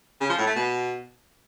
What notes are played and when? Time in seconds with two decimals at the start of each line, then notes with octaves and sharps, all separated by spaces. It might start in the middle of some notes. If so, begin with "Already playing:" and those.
0.21 C#3
0.30 F3
0.38 A2
0.47 A3
0.55 B2